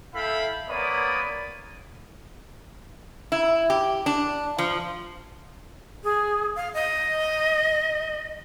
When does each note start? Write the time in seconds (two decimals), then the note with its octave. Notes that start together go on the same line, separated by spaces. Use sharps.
0.14 E4 A4 E5 F5 G5 B5
0.68 A#3 B3 C#5 D5 B5 D#6
3.32 E4
3.70 G4
4.06 D4
4.58 F3
6.04 G#4
6.56 F5
6.74 D#5